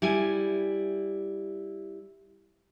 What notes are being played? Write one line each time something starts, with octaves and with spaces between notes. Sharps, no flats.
G3 E4 G#5